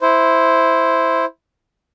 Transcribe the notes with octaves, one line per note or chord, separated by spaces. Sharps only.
E4 C5